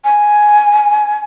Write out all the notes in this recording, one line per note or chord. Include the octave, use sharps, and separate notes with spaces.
G#5